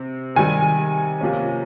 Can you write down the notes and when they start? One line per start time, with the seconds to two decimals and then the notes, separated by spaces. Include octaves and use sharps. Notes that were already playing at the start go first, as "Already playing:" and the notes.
Already playing: C3 C4
0.35 C3 D#3 G3 G#5
1.21 C3 F3 A#3 C#4